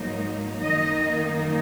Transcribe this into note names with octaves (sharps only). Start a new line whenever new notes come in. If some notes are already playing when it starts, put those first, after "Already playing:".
Already playing: G#2 F#3 A#3 D#4
F#2 D#3 A#3 D#4 D#5